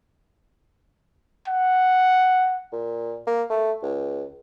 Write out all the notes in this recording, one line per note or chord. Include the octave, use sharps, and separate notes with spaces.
F#5
A#2
A#3
A3
C#2